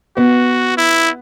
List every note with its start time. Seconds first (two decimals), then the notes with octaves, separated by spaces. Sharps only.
0.17 B3 F#4
0.77 E4